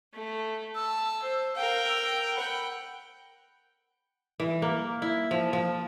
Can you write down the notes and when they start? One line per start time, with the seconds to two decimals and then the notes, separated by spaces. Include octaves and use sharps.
0.14 A3
0.75 A5 E6
1.22 C5
1.55 A#4 F5 G5
1.88 E6
2.36 F#5 G5 B5
4.40 E3
4.62 A#3
5.02 E4
5.31 F3
5.53 F3